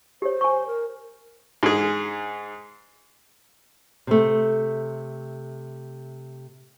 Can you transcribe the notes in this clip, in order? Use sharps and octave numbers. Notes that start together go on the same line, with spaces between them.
G4 C5 C#5
G#5 C#6
A#4
G#2 G#4
C3 A3